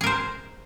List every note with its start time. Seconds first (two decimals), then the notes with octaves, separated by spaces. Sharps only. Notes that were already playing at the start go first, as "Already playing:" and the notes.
0.01 G#4
0.04 A#4
0.06 C5